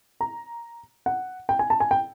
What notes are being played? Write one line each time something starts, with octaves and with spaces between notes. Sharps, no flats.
A#5
F#5
G5
G#5
A5
G#5
G5